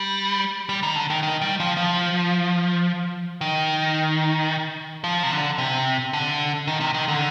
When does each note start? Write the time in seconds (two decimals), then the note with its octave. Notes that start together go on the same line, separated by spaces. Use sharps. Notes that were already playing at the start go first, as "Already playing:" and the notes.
Already playing: G3
0.69 G3
0.83 D#3
0.95 D3
1.10 D#3
1.23 D#3
1.41 G3
1.60 F3
1.77 F3
3.41 D#3
5.04 F3
5.23 C3
5.31 D3
5.58 C3
6.13 D3
6.67 D#3
6.80 C3
6.94 D#3
7.08 D3